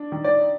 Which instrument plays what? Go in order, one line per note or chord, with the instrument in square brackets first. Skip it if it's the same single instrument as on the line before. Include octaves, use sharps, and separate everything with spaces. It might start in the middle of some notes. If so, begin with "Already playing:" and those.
Already playing: [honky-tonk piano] D4
D#3
[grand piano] D5